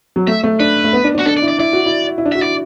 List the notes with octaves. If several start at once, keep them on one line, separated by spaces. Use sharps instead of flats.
F#3
A3 E5
A3
D4 B4
A3
B3
D4
D4
F#4
D4 A4
D5
E4
D5
E4 D5
F#4
E4
E4
D4
F#4 E5
E4 D5